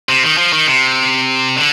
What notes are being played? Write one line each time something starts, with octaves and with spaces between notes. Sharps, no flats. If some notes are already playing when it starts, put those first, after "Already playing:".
C3
D#3
F3
D#3
C3
D3